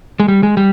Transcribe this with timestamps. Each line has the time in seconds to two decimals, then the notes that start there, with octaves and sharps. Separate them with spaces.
0.20 G#3
0.28 G3
0.43 G#3
0.57 G3